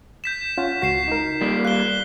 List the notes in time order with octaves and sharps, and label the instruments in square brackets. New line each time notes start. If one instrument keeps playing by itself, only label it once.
[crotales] G6 B6 E7
[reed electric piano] C#4 F4 F#5
[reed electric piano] C#2 F#4 [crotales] B6 C7 E7
[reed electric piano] D#4 A#4
[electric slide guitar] G3 A#3
[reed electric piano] F5 [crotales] F#6 G7